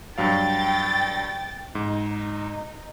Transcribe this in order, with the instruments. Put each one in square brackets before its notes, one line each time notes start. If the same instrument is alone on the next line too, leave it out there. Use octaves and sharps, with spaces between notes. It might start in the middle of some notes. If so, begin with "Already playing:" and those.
[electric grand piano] G2 F#3 F5 [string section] G5 A6
[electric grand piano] G#2 [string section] D#4